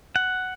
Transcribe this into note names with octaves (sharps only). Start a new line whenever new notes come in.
F#5